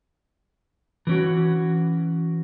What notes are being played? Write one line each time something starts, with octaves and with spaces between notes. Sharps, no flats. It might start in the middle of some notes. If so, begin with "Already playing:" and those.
E3 C#4 F#4